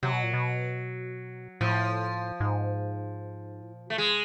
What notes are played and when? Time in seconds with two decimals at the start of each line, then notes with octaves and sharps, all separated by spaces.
0.03 C3 F#3
0.13 B2
0.23 A#2
0.34 B2
1.61 A2 F3
2.40 G#2
3.62 A2
3.74 A#2
3.86 B2 A3
3.98 C3 G#3